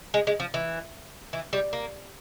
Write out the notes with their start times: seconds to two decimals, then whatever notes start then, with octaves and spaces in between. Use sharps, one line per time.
0.14 G#3
0.27 G#3
0.40 F3
0.54 E3
1.33 E3
1.53 G3
1.73 A#3